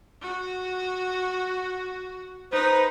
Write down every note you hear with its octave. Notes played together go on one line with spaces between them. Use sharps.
F#4
D#4 B4 C5